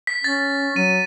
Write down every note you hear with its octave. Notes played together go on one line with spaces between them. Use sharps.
B6
C#4 A6
F#3 D#7